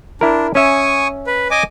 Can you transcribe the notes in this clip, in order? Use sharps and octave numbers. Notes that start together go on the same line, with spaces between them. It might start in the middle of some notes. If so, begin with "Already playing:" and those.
D4 E4 A#4
C#4 E5 G#5 C#6 D#6
B4
D#5 G#5 D6